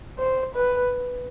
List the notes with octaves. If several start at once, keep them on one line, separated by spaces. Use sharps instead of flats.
C5
B4